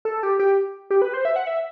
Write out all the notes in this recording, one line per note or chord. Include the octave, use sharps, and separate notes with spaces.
A4
G4
G4
G4
B4
C5
E5
F#5
E5